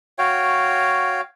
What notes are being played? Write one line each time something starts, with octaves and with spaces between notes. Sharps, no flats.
F#4 C#5 F5 G5